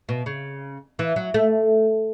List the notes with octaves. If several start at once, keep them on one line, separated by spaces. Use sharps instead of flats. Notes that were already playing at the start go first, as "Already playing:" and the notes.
B2
C#3
E3
F#3
A3